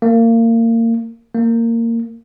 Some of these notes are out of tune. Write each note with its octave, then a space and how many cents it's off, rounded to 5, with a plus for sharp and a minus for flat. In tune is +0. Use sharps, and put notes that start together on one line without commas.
A#3 -30
A#3 -20